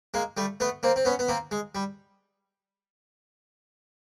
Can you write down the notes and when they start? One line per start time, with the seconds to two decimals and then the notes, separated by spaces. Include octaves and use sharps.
0.14 G#3 A#3
0.37 G3 A3
0.60 A3 B3
0.83 A#3 C4
0.96 C4
1.05 B3 C#4
1.19 B3
1.28 A#3 C4
1.51 G#3
1.75 G3